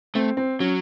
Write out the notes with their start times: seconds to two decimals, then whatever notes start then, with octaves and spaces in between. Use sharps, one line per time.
0.15 A3 C4
0.37 C4
0.60 F#3 C#4